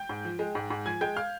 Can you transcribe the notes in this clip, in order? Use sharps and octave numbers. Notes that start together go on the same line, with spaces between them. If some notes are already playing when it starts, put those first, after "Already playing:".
Already playing: G5 G6
G#2
F3
G#3
G#2
G#2
F3 G#5 G#6
G#3 G5 G6
F5 F6